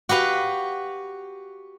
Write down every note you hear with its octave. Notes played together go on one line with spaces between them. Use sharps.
F#4 G4 B4 F5